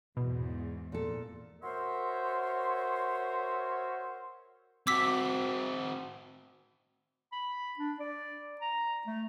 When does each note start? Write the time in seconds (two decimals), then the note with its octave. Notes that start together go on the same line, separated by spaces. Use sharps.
0.17 E2 G#2 B2
0.92 A#2 A4
1.62 F#4 A#4 C5 C#5 E5 C6
4.87 C4 F#4 D6 E6 B6
7.32 B5
7.79 D4
8.00 D5
8.61 A#5
9.07 A3